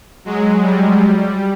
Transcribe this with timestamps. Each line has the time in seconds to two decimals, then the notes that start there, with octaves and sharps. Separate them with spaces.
0.25 F#3 G#3
0.62 G3
0.97 G3